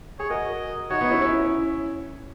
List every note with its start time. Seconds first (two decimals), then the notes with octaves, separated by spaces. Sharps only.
0.20 G#4 C#5
0.30 F#4 A#4 D#5
0.90 D#4 F#4 C#5
1.01 B3 D#4
1.11 C#4 E4
1.21 C#4 E4